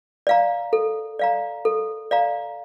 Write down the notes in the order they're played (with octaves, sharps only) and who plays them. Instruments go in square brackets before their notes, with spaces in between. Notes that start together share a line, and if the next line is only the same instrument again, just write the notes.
[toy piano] D5 F5 A#5
A4
D5 F5 A#5
A4
D5 F5 A#5